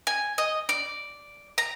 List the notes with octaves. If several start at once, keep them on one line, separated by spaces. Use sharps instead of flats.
G#5
D#5
D5
A#5